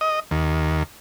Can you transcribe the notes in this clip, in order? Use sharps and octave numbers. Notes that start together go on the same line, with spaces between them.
D#5
D#2